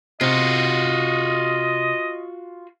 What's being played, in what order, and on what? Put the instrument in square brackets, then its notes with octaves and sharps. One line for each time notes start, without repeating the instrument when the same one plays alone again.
[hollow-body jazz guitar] C3 [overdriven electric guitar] F4 F#4 [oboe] D#5